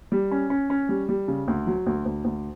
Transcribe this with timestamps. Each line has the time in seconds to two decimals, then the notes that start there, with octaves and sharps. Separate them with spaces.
0.12 G3
0.31 C#4
0.50 C#4
0.70 C#4
0.89 G3
1.09 G3
1.28 C#3
1.48 D2
1.67 F#3
1.87 D2
2.06 D2
2.24 D2